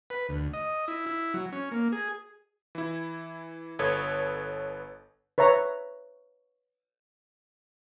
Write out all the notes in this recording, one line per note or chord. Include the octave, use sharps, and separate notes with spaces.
B4
D2
D#5
E4
E4
F#3
C#4
A#3
G#4
E3 E4
G1 A4 B4 C#5 D#6 G#6
B4 C#5 E5 A#5 C#6